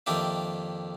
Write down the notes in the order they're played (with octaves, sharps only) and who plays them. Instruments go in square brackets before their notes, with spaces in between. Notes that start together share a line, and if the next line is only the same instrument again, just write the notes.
[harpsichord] F2 D#3 A#3 D4 G4 E5